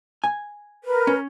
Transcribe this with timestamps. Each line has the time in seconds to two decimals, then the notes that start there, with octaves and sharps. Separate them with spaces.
0.24 G#5
0.84 A#4 B4
1.07 C#4